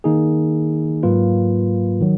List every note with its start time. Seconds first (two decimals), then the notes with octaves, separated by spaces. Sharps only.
0.04 D#3 A#3 D#4 G#4
1.03 G#2 F#3 A#3 F4 B4
2.01 D#3 F#3